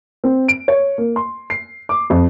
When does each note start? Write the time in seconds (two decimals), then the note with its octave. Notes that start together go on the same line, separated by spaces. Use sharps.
0.24 C4
0.48 D7
0.68 C#5
0.98 A#3
1.16 C6
1.50 C7
1.89 D6
2.10 F2